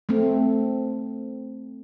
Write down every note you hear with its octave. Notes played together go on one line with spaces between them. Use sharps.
A3 C4